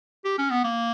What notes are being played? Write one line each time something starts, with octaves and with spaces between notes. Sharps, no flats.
G4
C#4
B3
A#3